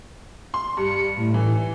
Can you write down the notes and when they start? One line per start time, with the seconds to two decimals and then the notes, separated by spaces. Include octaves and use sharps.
0.54 C6
0.77 G2 C#7
1.17 A2
1.34 E3